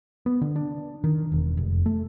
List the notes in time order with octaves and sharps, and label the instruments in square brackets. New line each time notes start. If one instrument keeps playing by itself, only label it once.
[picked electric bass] B3
D3
D4
D#3
E1
F1
A3